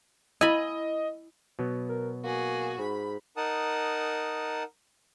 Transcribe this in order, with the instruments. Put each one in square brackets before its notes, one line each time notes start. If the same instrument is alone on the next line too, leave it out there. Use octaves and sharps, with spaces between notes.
[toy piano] E4 E6 [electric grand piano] D#5 [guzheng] G#5 B5
[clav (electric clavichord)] B2 F#3 B3
[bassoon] A#4
[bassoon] A#3 [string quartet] F#4 G#4
[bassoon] G#2 [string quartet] B5
[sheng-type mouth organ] D#4 A#4 F#5 A5 D#6